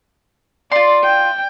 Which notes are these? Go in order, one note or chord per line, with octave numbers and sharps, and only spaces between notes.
F4 D5 C6
G5